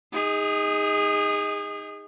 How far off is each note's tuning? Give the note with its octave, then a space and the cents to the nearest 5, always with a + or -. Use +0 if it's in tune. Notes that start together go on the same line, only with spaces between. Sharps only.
D#4 +15 G#4 -25